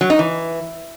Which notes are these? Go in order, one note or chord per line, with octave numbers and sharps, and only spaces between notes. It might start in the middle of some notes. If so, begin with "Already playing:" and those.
F#3
D#4
E3